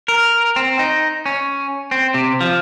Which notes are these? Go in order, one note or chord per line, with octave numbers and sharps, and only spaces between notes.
A#4
C4
D#4
C#4
C4
C3
F3